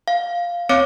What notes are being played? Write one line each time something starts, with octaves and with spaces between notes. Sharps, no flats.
F5
C4 C#5 F5 D6 C#7